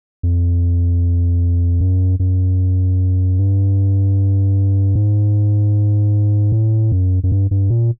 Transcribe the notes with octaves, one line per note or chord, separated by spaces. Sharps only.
F2
F#2
F#2
G2
G#2
A2
F#2
F#2
G2
G2
A#2